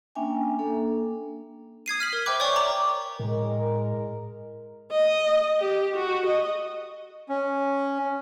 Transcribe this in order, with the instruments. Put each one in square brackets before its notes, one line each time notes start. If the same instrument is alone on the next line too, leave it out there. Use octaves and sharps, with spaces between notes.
[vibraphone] A#3 C#4 D4 E5 G5 G#5
A#3 D4 A4
[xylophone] D#6 G#6 C7 D#7
F6 B6 F#7
A#4
C5 E5 G5 B5 D6 F#6
C#5 D5 G5 G#5 C#6
A#5 D6 F#7
[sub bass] A2 [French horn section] G#3 A#4
[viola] D#5
G4
F#4
D#5
[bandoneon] C#4